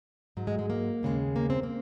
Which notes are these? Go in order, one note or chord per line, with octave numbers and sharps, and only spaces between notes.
G#2 F#3
G#3
G#3
A#3
D#2 C#3 F3 G#3
A#3
C4
A#3